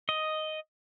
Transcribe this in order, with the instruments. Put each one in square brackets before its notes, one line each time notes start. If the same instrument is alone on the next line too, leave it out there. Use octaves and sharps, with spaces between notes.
[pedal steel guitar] D#5